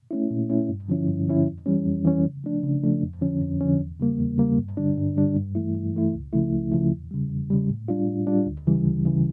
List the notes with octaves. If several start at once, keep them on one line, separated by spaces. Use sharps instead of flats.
A3 C#4 E4
A#2
A3 C#4 E4
G2
D3 F3 C#4 E4
G2
D3 F3 C#4 E4
F2
E3 G3 C#4
F2
E3 G3 C#4
C#3
F3 A3 D4
C#3
F3 A3 D4
F2
D3 F3 C#4
F2
D3 F3 C#4
E2
C#3 G3 A#3
E2
C#3 G3 A#3
G2
D3 G3 D4
G2
D3 G3 D4
G2
E3 A3 E4
G2
E3 A3 E4
C#2
C#3 F3 A3 E4
C#2
C#3 F3 A3 E4
E2
C#3 G3
E2
C#3 G3
A2
G3 D4 F4
A2
G3 D4 F4
D2
C#3 E3 G3
D2
C#3 E3 G3